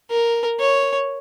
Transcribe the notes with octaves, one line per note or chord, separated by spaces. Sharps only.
A#4
C#5